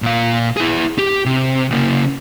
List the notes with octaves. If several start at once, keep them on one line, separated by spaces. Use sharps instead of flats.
A#2 F5
E4 G#4
G4
C3
C#3 A#3